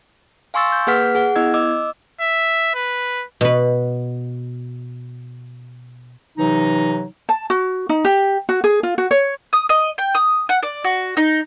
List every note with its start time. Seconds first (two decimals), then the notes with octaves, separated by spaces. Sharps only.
0.54 F5 G#5 C6 C#6 E6 A6
0.72 G6
0.87 A#3 G#4 B4 F#5 F6 B6
1.15 G#4 F#5
1.36 B3 E4 D#5 E6 G#6
1.54 D#5 D6 E6
2.21 E5
2.75 B4
3.41 B2 B4
6.38 C3 E3 F#3 D#4
7.29 A5
7.50 F#4
7.89 D#4
8.05 G4
8.49 F#4
8.64 G#4
8.83 F4
8.98 F#4
9.11 C#5
9.53 D#6
9.69 D#5
9.98 G5
10.15 D#6
10.49 F#5
10.63 D5
10.84 F#4
11.17 D#4